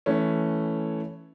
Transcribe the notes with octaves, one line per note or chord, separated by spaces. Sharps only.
E3 A3 C#4